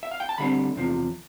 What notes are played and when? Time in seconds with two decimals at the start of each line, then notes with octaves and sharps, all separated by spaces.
0.03 E5
0.11 F5
0.20 G5
0.29 A5
0.38 D2 D3 G3 C4 B5
0.76 E2 C3 F3